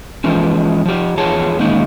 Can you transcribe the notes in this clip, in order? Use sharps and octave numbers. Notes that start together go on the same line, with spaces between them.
E3 F3 G#3 C#4
F3 G4
E2 F3 G#4 C#5 A5
D#3 G#3 A#3 C#4 D#4